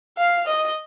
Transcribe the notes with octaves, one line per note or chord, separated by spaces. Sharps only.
F5
D#5